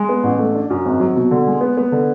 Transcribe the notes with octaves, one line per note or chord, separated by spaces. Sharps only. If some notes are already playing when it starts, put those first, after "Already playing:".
Already playing: G#3
B3
A1
A3
D4
F#2
G#1
F#3
B2
D3
G#3
B3
B3
D3